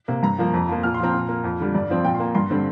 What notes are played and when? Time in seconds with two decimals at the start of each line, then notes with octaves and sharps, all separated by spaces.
0.08 C3 A#3
0.23 G2 A#5
0.39 F3 A#3
0.54 F2
0.69 F3 A#3
0.83 A#2 F6
0.94 C6
1.00 F3 C4 A#5
1.14 A#2
1.29 A#3
1.44 F2
1.60 D3 G3
1.75 G2 D5
1.90 F3 C4
2.04 A#2 G5
2.15 C6
2.20 A#3
2.35 G2 C6
2.50 D3 G3 C4